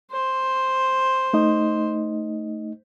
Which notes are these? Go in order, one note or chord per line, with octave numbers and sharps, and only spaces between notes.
C5
A3 D#4 D#5